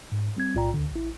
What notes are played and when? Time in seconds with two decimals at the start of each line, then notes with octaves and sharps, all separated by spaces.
0.12 G#2
0.37 G3 C4 G#6
0.55 B1 A2 F4 D5 G5 A#5
0.74 D2 D3
0.91 A1 E4